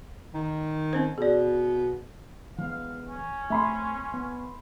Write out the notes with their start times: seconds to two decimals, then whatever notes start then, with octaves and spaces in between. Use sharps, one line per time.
0.34 D#3
0.93 C4 C#4 C5
1.18 B2 G#4 D5
2.58 E3 G#3 B3 F5
3.08 C#4
3.50 A3 C4 E5 B5 C6
4.14 B3